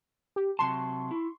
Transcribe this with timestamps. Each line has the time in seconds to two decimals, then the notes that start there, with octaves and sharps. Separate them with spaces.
0.36 G4
0.59 C3 F#3 A5 C6 C#6
1.11 E4